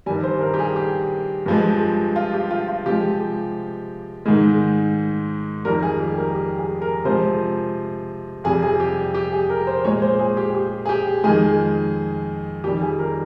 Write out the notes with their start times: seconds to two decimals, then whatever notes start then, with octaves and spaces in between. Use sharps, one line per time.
0.06 G2 D#3 G3 G#5
0.24 C5
0.41 A#4
0.54 G4
0.59 G#4
0.76 G4
1.46 G2 F3 G#3
2.16 F4
2.33 G4
2.51 F4
2.68 F4
2.86 C3 F3 G#3 G4
4.26 G#2 D#3 G#3
5.65 F2 D#3 G3 A#4
5.83 G#4
6.00 G4
6.18 A#4
6.35 G4
6.58 G#4
6.82 A#4
7.05 C3 F3 G#3 C5
8.44 F2 C3 G3 G#4
8.62 G#4
8.80 G4
9.15 G4
9.32 G#4
9.50 A#4
9.67 C5
9.85 A#2 G#3 C#5
10.02 C5
10.19 G#4
10.37 G4
10.55 G4
10.86 G#4
10.89 G4
11.24 F2 D#3 G#3 G#4
12.64 F2 D#3 G3 G4
12.82 G#4
12.99 A#4